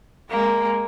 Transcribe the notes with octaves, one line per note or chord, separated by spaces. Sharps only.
G#3 A#3